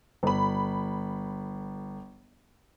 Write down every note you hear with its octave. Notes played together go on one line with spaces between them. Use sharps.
G1 B5